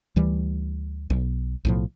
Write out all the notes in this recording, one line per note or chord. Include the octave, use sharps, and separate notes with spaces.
D2 E3 G3
B1
B1 A2 F3